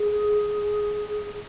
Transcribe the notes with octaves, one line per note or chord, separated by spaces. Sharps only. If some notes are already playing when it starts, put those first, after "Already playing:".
Already playing: G#4